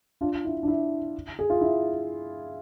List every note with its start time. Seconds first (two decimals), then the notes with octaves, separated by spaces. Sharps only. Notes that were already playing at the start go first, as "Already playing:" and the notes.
0.21 D4 F4
0.45 E4
0.63 D4
0.68 E4
1.39 G#4
1.50 F4
1.61 E4